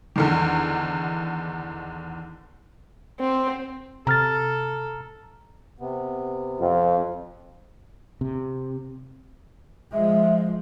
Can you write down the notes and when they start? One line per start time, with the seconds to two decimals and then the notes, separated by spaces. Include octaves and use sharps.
0.16 E2 D3 D#3
3.20 C4
4.07 C3 A4 A#5 F6 A6
5.80 C3 B3
6.61 F2 C4 F4
8.21 C3
9.93 F3 G#3 E5